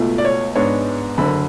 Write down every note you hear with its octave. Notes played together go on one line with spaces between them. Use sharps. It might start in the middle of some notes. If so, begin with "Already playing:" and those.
Already playing: C#2 B2 A3
D5
C#5
G#2 G#3 B3 D4 C#5
F#1 F#2 D3 B5